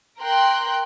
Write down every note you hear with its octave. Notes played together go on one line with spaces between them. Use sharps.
A#4 G5 C6 F#6